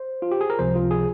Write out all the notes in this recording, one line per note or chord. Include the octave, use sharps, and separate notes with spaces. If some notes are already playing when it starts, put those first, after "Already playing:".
Already playing: C5
F4
G4
G#4
A#4
C#2 C3 F3 C5
F4
G#4